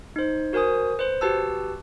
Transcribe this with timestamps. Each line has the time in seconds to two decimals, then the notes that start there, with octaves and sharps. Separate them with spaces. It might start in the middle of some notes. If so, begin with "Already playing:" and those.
0.16 D#4 C5
0.53 F#4 A#4 C5 G#5 D#6
0.99 B4 C5
1.21 F#4 G4 B4 A5 E6